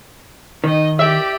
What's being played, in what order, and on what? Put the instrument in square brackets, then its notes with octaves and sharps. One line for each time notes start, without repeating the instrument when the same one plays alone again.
[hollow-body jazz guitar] D#3 [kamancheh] D#4 D#5
[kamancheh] G4 D5 [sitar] E5